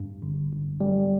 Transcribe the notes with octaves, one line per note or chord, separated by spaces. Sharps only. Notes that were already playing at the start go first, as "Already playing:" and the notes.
Already playing: G2
G1
G1
G3